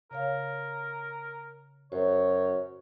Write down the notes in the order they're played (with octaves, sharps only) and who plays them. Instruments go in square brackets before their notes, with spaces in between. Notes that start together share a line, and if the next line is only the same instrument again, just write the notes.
[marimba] C#3 C#5 F5 [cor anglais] A#4
[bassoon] F#2 [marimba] F#4 C5 [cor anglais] C#5